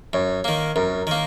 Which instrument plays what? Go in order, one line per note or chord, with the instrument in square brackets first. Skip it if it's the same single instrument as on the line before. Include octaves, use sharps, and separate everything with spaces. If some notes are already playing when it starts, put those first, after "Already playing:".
[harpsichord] F#2 [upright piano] C#5
[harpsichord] D#3 A#3
[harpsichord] F#2 [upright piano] A#4
[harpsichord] D#3 A#3